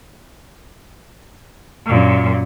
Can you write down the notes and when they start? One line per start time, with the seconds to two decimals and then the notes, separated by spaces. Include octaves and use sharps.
1.86 F#2 A#2